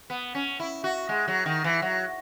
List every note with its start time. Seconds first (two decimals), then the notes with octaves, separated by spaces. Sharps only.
0.10 B3
0.35 C#4
0.60 E4
0.84 F#4
1.09 G#3
1.28 F#3
1.46 D#3
1.64 E3
1.82 F#3